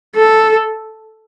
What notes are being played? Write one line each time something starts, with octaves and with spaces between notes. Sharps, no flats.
A4